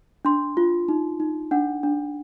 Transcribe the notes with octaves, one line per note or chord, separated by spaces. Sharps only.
D4 C6
F4
D#4
D#4
D4 F#5
D4